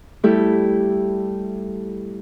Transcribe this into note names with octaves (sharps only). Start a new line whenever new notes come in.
G3 A3 E4 G4 A4